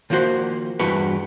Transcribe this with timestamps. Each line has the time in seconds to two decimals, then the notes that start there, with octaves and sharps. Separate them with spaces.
0.10 D#3 F3 A#3 F#4 C5
0.79 E2 G2 E4 F#4 B4